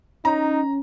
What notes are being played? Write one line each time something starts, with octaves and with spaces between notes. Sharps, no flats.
C#4 D#4 A#5